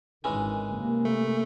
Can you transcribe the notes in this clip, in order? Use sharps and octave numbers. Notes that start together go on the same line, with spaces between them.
G#1 D#3 E3 G#3 C#4
C3 A#3
A3